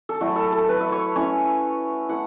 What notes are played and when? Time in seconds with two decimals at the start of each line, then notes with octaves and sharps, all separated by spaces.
0.09 A4
0.21 F#3 A3 E4 F#4
0.36 A4
0.52 A4
0.69 B4
0.81 E5
0.92 C#5
1.16 A3 C#4 E4 C#5
2.09 A3 E4 F#5